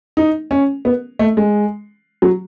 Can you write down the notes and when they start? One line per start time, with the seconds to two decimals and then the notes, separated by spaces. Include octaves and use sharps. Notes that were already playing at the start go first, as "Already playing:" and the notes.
0.17 D#4
0.51 C#4
0.85 B3
1.19 A3
1.37 G#3
2.22 F#3